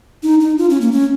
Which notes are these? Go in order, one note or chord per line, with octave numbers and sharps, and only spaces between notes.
D#4
D#4
F4
C#4
A#3
C#4